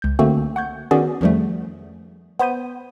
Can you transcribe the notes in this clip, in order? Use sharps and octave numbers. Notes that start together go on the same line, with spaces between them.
C#2 G6
D3 A3 A#3 C4 F#4
F#5 C#6 G6 G#6
D#3 B3 C#4 F#4 G#4 D5
F2 D#3 F3 G3 A3
B3 C5 B5 G6 D#7